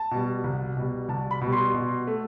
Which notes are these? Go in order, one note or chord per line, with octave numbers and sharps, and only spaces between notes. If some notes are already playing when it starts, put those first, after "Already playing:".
Already playing: A5
B2 G3
C2
B2 G3
C2 A5
B5
B2
G3
C6
B2
A3